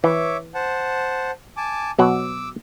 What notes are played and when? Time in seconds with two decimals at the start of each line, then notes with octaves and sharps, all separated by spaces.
0.04 E3 C#5 E5 D6
0.54 C5 F#5 A5
1.57 G#5 A5 D6
1.99 B2 F#3 F#5 D6 E6